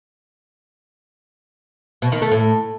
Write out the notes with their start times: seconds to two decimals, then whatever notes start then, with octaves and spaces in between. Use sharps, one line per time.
2.02 B2
2.12 D#3
2.22 A3
2.32 A2